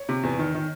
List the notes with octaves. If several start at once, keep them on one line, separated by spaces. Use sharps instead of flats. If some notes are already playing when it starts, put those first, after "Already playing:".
Already playing: C#5
C3
E2
D#3
D#3